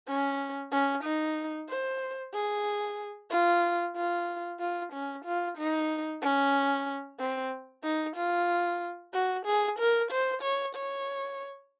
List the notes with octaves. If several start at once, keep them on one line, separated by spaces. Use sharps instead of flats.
C#4
C#4
D#4
C5
G#4
F4
F4
F4
C#4
F4
D#4
C#4
C4
D#4
F4
F#4
G#4
A#4
C5
C#5
C#5